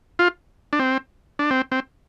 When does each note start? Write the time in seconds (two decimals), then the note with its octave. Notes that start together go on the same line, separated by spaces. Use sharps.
0.19 F4
0.73 D4
0.79 C4
1.39 D4
1.51 C4
1.72 C4